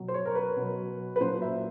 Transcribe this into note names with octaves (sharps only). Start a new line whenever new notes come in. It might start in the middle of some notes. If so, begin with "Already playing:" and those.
Already playing: B2 F#3
C5
C#5
A#4
B4
B2 F#3
B4
A#2 F#3 C5
E5